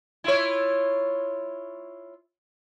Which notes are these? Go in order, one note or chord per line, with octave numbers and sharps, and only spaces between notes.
E4 F4 C#5